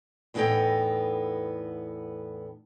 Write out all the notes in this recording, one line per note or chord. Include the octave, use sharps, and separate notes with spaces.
E2 A2 B3 D#4 A4 G5